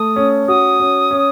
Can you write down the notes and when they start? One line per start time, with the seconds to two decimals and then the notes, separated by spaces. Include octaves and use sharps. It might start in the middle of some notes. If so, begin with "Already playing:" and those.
Already playing: A3 D#6
0.16 C#4
0.48 F#4 D#6
0.80 C#4
1.11 C#4